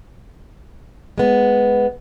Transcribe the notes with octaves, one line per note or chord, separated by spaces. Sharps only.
G#3 B3